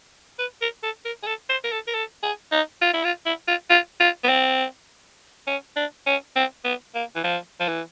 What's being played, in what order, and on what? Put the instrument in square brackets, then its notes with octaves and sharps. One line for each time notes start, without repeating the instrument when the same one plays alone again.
[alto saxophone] B4
A#4
A4
A#4
G#4
A4
C5
A#4
A4
A#4
A4
G#4
D#4
F4
E4
F4
E4
F4
F4
F4
B3
C4
C#4
D4
C#4
C4
B3
A#3
E3
F3
F3
E3